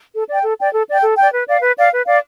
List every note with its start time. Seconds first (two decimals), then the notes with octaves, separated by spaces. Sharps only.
0.14 A4
0.29 D5 G5
0.43 A4
0.58 D5 G5
0.73 A4
0.87 D5 G5
1.03 A4
1.17 D5 G5
1.33 B4
1.47 D5 F5
1.62 B4
1.77 D5 F5
1.92 B4
2.06 D5 F5